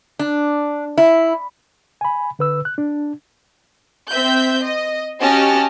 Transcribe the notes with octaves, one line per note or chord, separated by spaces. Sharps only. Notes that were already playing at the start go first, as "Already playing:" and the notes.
D4
E4
G#5 B5
D3 B4 E6
F#6
D4
C4 E5 G6
D#5
C#4 F#4 G4 D#5 A5 F6